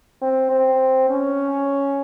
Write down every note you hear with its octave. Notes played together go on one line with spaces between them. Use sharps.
C4
C4
C#4